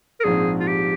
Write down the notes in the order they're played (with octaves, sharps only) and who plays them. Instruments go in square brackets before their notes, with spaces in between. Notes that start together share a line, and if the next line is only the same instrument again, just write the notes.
[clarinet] A#4
[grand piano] A#1 G#2 F3 C4 [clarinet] G#4
[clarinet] F4
G4